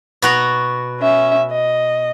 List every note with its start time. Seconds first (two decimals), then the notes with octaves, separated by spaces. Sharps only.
0.22 B2 F#4 A#5
1.00 C#4 E5
1.51 D#5